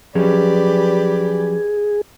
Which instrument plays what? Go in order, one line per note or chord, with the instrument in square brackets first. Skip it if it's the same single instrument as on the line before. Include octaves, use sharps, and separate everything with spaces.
[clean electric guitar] F3 F#3 C#4 [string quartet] G4 B4 D5 [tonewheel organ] G#4